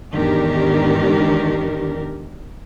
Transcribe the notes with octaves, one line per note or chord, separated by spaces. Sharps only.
E2 G#2 D#3 D4 G4 A#4